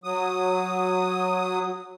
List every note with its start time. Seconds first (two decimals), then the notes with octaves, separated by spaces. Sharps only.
0.04 F#3 D#6